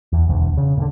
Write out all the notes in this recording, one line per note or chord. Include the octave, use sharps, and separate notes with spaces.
E2
E1 D2
C#3
A#2 D3